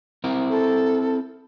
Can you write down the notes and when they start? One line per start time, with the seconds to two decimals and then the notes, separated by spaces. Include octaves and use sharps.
0.24 C4 E4 A#4
0.50 A4